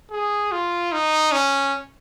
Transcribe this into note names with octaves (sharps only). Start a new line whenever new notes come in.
G#4
F4
D#4
C#4